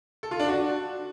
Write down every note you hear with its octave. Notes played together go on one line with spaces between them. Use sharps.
A4
F4
D4
F#4